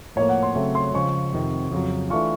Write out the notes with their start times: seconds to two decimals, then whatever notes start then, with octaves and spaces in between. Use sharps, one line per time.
0.16 A2 F3 A#3 C#5
0.29 F#5
0.43 C6
0.55 C#3 F#3 A3 C4
0.75 C6
0.94 C#3 F3 G#3 C#6
1.33 F2 C3 D#3
1.71 F2 C#3 F#3
2.10 E3 A3 D4 F4 C#6